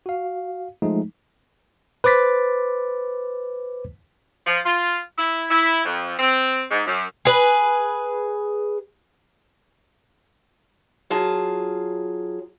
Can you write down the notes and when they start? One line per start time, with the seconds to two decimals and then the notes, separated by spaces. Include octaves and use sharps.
0.06 F#4 F5
0.82 F3 G#3 A3 D#4
2.04 B4 C5 D6 A6 B6
4.47 F3
4.66 F4
5.18 E4
5.50 E4
5.85 F2
6.19 C4
6.71 G#2
6.87 F#2
7.25 G#4 B4
11.10 F#3 F4 G#4 A5